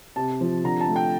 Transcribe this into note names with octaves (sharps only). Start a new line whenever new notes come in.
C3 A5
F3
D3 A#5
A5
A3
G5